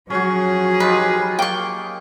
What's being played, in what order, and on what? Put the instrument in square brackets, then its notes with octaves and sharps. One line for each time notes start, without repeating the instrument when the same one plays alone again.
[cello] F3 G#4 [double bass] F#3 [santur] C#4 F#4
[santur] D#4 F4 G4 [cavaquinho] B4
[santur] A#3 [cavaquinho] G5 C#6